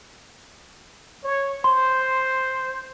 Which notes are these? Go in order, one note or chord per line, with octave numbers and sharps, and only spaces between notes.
C#5
C5 C6